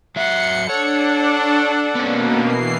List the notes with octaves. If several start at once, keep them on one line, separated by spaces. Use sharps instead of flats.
F#3 E5 F#5 C6 C#7
D4 A4 C#5 F#5
B2 A#3 B3 C#4
E3 C7